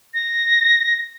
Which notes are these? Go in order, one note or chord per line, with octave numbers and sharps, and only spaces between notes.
A#6